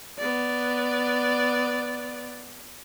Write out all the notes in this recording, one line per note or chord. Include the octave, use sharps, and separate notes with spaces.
B3 D5